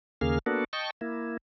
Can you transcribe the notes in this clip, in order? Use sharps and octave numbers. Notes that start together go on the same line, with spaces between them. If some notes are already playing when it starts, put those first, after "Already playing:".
D#2 C#3 A#3 G#4 F6
A#3 B3 D4 F#4 A4
D#5 G5 A5 C#6
A#3 E4